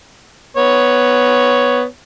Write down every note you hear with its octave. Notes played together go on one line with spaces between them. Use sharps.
B3 C#5